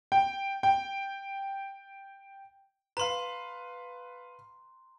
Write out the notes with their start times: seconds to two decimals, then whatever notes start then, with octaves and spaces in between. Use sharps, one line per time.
0.12 G5
0.63 G5
2.97 B4 F5 A#5 C6